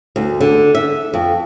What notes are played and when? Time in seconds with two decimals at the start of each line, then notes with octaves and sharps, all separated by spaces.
0.16 D2
0.41 D3
0.75 E5
1.13 F2